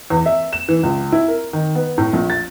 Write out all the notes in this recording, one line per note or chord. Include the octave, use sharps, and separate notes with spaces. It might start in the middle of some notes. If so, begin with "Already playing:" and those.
E2
E5
E7
E3
C#2
E4
A#4
D#3
B3
A2
A#1
A6